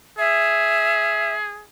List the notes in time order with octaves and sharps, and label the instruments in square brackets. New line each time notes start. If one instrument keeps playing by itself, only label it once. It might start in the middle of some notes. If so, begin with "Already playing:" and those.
[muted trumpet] G#4 [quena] E5